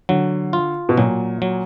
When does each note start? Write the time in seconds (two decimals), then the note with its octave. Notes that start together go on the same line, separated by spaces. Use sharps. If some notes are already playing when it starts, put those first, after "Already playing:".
0.09 D3 F#3
0.53 F4
0.89 B2
0.97 A#2 F#3
1.42 F#3